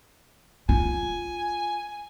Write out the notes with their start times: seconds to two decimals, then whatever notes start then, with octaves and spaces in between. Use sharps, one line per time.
0.69 F4 G#5